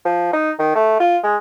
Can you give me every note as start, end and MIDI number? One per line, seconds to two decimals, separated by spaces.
0.05 0.30 53
0.33 0.51 63
0.59 0.75 51
0.75 1.00 57
1.00 1.18 65
1.24 1.36 56